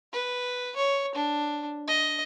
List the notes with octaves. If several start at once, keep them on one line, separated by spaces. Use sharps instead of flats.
B4
C#5
D4
D#5